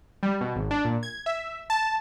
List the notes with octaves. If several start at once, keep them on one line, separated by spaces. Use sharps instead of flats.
G3
B2
G#1
D4
A#2
G#6
E5
A5